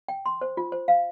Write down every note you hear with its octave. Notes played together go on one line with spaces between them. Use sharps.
G5
C6
C5
F4
C5
F5